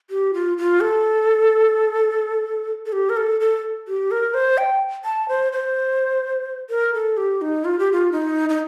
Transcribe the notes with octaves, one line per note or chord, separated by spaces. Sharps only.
G4
F4
F4
A4
A4
G4
A#4
A4
A4
G4
A#4
C5
G5
A5
C5
C5
A#4
A4
G4
D#4
F4
G4
F4
D#4
D#4